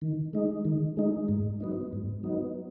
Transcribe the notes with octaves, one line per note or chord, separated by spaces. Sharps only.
D#3
G#3 D#4
D#3
G#3 D#4
G#2
F#3 B3 D#4
G#2
F#3 B3 D#4